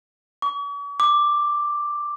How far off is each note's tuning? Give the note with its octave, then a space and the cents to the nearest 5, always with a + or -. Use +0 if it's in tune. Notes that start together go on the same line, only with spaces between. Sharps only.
C#6 +45
D6 +5